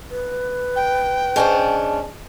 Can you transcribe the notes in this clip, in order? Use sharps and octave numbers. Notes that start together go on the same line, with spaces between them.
B4
G5
C#4 D4 G#4 C5 D#5 A5